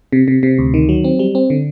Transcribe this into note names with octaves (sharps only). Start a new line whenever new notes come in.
C3
C3
C3
D2
D#3
F#3
C4
G3
C4
D3